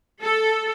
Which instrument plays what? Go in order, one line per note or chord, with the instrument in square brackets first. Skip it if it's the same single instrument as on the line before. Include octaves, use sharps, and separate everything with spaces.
[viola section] A4